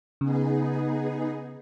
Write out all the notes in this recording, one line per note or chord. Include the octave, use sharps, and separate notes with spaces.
C#3 B3 D#4 G#4